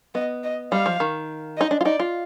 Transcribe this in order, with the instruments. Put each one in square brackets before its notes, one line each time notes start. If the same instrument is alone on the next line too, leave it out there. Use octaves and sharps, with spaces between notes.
[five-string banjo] B3 [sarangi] D#5
[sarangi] D#5
[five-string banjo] G3 [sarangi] F5
[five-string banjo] F3
D#3
[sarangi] D#5
[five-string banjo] D#4
D4
F4
[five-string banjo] D#4 [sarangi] D5
[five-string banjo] F4